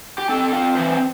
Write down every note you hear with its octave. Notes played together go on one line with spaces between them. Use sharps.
G4
C4 A4
C4 F4
E3 C5